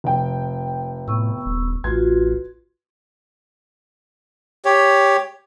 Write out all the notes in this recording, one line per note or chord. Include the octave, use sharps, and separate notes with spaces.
F1 G5
A2 B3 C#6 E6
D#1
A1 F4 F#4 B4 C6 G#6
G4 C#5